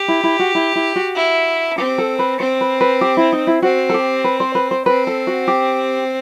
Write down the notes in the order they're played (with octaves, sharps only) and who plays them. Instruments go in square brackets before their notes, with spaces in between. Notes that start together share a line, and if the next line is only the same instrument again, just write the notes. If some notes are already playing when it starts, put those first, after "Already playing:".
Already playing: [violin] G4
[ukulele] E4
E4
F#4
E4
E4
F#4
[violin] E4
[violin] C4 [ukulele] G4
[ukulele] A4
B4
[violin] C4 [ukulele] C5
[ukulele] B4
B4
G4
E4
D#4
E4
[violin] C4 [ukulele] F#4
[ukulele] A4
G4
B4
C5
B4
C5
[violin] C4 [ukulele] B4
[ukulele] A4
F#4
G4